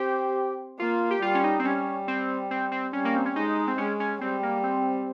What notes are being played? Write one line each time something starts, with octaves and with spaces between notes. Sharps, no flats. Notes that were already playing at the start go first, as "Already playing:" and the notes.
Already playing: C4 G4
A#3 F4
G4
G3 F4
C#4
D#4
C4
G3 C#4
C4
C4
C4
G3 C#4
A#3
C4
C#4
G#3 D#4
C4
G#3 C#4
C#4
G3 C4
A#3
C4